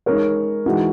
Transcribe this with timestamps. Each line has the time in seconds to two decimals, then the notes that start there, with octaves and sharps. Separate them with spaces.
0.06 G#3 D#4 A#4 C#5
0.66 E3 G#3 D#4 F#4